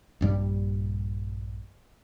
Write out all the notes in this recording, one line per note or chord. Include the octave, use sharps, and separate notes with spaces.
A#1 G2 G3